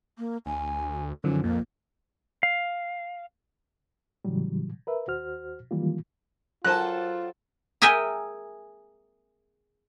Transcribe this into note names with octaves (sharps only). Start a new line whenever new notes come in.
A#3
D2 G#5
F#2 D3 D#3 F3 C#4
A#1 F2 A#2 A#3
F5
A2 C#3 E3 F#3 G3
A#4 B4 E5
D#2 F#4 C5 F6
D#3 E3 F#3 G3 A#3 F4
F#3 F4 A4 A#4 C5 G#5 A5 F#6
G#4 A#4 E5 G5 G#5